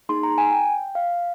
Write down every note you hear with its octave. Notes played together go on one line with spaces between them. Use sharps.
A#3 D#4 G#4 C6
A#5
G#5
G5
F5